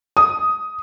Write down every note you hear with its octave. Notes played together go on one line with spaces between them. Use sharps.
D#6